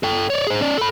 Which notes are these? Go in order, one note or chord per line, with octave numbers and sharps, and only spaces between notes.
A4 G5
C#5 D5
G#4 C5
C#4 D5
A4 B5